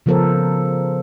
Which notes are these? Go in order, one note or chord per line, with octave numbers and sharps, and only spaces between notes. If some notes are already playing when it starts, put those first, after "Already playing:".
C#3 F3 B3 A4 A#4 C5